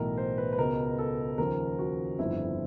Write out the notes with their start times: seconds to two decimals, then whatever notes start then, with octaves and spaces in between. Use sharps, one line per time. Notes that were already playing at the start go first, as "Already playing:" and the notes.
Already playing: B1 A2 E3 A#4
0.17 C5
0.38 B4
0.53 B4
0.58 C#2 B2 A#4
0.98 A4
1.38 D#2 C#3 F3 A#4
1.79 F#4
2.19 G1 F2 D3 F3 E4